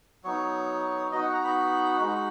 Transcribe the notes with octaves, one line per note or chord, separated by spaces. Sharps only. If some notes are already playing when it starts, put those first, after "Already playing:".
F#3 B3 D#4 C#5
B3 D#4 F#4 D#5
F#5
A#5
B5
G#3 D#4 F#4